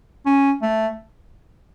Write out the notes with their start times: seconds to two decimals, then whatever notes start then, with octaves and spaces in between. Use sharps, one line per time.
0.26 C#4
0.62 A3